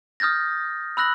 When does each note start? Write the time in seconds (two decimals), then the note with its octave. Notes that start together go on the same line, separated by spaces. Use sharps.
0.20 D#6 F6 G6 A6 A#6
0.97 B5 E6 F#6 A#6 F#7